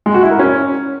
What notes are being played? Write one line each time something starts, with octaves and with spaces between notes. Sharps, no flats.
G#3
F#4
E4
A#4
C#4